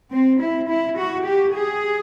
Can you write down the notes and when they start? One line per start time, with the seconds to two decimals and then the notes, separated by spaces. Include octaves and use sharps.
0.12 C4
0.41 E4
0.69 E4
0.97 F#4
1.25 G4
1.54 G#4